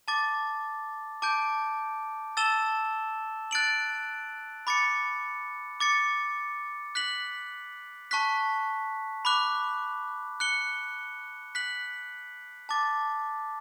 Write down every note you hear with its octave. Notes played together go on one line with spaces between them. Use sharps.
A5 D6 A6
A5 D6 G6 D7
A5 E6 A6 E7 G7
F#6 A6 D7 F#7
B5 D6 A6 C#7
D6 A6 C#7
F#6 B6 F#7
A5 C#6 F#6 B6
B5 D6 F#6
F#6 C#7 G7
F#6 B6 F#7
A5 D6 A6